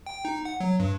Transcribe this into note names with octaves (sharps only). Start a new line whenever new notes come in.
G5
D#4
F#5
F#3
G2